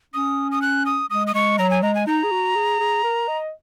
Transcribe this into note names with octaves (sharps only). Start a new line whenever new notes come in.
C#4 D#6
D#6
F#6
D#6
G#3 D#6
D#6
G#3 C#6
F#3 A#5
G#5
G#3 A#5
G#5
D#4 A#5
G#4
F#4
G#4
G#4
A#4
D#5